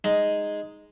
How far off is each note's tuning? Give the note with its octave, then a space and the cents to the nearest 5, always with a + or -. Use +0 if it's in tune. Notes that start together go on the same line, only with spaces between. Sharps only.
G#3 +0 D#4 +0